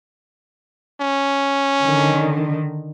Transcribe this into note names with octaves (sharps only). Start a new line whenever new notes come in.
C#4
D3 D#3